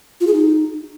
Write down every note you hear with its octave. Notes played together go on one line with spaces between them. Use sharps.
F4
G#4
D#4